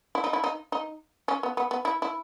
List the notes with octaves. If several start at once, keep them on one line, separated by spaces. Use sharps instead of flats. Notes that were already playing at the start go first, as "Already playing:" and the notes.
E4
D#4
E4
D#4
D#4
C#4
B3
B3
B3
E4
E4